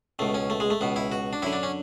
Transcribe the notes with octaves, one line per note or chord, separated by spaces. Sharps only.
C#2 B2 A3
C#4
A3
G#3
A3
C#2 B2 B3
E4
F#4
D4
F#2 D3 E4
D4
C#4